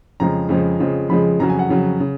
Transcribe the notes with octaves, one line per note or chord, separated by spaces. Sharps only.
F2 C#3 F3 G#3 A#5
F2 C#3 F3 G#3
F2 C#3 F3 G#3
F2 C#3 F3 G#3 B5
F2 C#3 F#3 A#5
G#5
F#5
F2 C#3 F#3
C#3